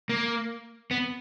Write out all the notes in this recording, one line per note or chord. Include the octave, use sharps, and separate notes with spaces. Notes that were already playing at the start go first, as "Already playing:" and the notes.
A#3
B3